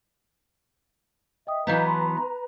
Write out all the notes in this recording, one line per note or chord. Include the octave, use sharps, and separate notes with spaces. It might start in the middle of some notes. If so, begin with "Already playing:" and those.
D#5 E5 G5 D#6
E3 F#3 B3 B4 D#5 F5 A#5 G6
A5 B5 C6